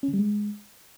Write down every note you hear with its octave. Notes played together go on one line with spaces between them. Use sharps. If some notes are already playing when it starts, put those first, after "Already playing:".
C#4
D3
G3
G#3